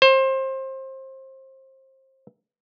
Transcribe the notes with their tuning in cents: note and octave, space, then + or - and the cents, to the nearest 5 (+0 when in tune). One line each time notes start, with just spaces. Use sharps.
C5 +25